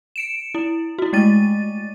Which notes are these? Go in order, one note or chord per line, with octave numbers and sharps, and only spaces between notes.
C#7 D7 E7
E4
E4 F#4
G#3 A3 A6 D#7